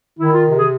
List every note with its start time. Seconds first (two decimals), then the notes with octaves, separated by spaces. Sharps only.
0.19 D#3 E4
0.32 F4
0.44 C3
0.56 G#4